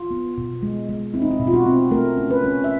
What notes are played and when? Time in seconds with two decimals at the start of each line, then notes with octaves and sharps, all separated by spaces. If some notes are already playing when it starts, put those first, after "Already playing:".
Already playing: F4
0.11 B3
0.38 B2
0.63 G#3
0.89 G#3
1.14 C4 E4
1.22 D#4
1.31 E4
1.40 B2
1.47 F4
1.54 F#4
1.66 C4
1.91 A3 A#4
2.17 C#4
2.31 B4
2.44 C#4
2.64 E5